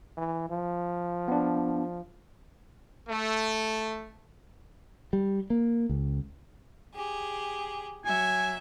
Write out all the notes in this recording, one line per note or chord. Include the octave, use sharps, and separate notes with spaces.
E3
F3
B3 D4
A3
G3
A#3
C#2
G4 G#4
F#3 E5 G#5